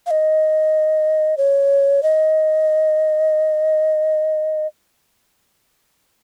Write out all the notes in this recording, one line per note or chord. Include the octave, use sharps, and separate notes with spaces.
F5
D#5
C#5
D#5